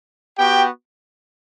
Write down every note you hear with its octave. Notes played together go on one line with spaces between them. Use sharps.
B3 F#4 G4 G5